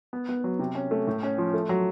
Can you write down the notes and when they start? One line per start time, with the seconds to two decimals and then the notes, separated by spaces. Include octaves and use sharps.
0.13 B3
0.29 B3
0.44 F#3
0.59 C3
0.75 C#4
0.91 A3
1.07 A2
1.23 C#4
1.38 F3
1.54 A3
1.69 F#3